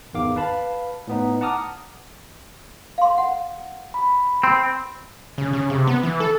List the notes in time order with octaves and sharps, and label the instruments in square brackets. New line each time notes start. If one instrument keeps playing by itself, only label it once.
[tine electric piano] G#1 E2 D#3 F5 D6
B4 F5 A5 B5
A2 B3 D#4
F#5 A5 A#5 D6 D#6 F6
[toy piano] F5 C6
F#5
[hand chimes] B5
[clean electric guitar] C4 [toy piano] C6
[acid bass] C#3
C#3
C3
B3
E3
A4